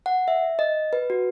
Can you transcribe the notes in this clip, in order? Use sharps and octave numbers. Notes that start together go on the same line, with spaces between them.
F#5
E5
D#5
B4
F#4